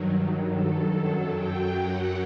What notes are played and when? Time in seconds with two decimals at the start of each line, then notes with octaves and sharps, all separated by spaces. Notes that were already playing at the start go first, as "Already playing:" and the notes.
Already playing: G2 D#3 F#3
0.47 A4
0.89 F#2 F#3
1.32 G5
1.76 F#5